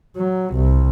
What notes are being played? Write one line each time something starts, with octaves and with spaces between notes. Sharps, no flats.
F#3
C2